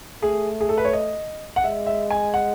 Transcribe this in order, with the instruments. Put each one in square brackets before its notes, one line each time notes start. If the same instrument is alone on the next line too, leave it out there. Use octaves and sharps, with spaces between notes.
[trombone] A3 [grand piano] G#4
[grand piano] G#4
A4
B4
C#5
D#5
F#5
[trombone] G#3 [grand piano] E5
[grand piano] E5
G#5
F#5